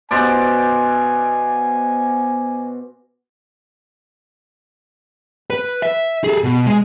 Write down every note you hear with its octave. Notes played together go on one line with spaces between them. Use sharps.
B2 C5 D5 G#5
B4
E5
G#4 A4
B2
G#3